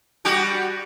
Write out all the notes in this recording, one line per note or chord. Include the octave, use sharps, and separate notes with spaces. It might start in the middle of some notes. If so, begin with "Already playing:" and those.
G3 F#4 G4